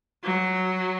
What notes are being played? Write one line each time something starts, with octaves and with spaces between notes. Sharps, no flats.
F#3